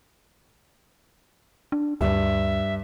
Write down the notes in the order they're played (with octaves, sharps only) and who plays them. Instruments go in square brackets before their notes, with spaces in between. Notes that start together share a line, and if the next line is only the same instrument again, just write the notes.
[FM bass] D4
[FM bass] D2 [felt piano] G2 [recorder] E5